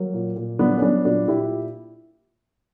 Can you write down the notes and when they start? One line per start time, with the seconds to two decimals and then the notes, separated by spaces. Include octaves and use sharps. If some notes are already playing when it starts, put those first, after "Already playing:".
Already playing: F#3 A#3
0.14 A#2
0.36 A#2
0.59 F#3 B3 D4
0.77 C#4
0.82 F#3 B3 D4
1.05 A#2 D4 F#4
1.28 A#2 E4 G4